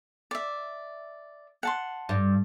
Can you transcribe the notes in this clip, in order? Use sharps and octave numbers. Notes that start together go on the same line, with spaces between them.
D5 E5
F#5 A5 C6
G2